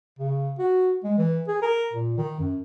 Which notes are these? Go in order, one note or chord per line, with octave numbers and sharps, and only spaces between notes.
C#3
F#4
G#3
E3
G#4
A#4
A#2
D#3
F#2